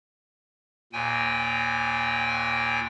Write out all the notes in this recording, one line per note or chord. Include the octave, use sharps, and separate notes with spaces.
D#2 A#2 G5 G#5